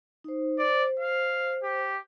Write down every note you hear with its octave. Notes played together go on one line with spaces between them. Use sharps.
D#4 C5
C5 D5
F5
G4